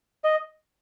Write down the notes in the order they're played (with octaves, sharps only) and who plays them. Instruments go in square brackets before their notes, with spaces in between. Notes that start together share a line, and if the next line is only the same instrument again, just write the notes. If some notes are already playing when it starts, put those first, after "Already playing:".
[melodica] D#5